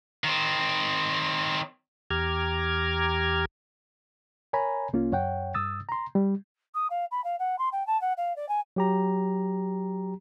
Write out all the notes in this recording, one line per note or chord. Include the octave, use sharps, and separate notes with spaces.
D#3 C4
E2 G4 A#5 D6 F6 G#6
A#4 C#5 G#5 A#5 B5
C2 A#3 C#4 F4
F#2 C#5 F#5 G5
G2 D#6 E6 A6
A#5 C6
G3
D#6
F5
B5
F5
F#5
C6
G5
A5
F#5
F5
D5
G#5
F#3 G4 A#5